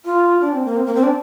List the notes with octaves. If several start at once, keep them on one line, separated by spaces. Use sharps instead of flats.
F4
D4
C4
A#3
C4
A#3
C4
D4